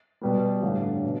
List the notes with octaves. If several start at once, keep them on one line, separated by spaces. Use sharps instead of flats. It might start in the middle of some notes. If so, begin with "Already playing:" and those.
B2 G3 B3
A1 G2 D3
B2